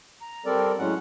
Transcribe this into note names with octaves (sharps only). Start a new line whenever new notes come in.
A#5
G3 C4 A4 A#4 D5
A2 F#3 G#3 C#4 F#5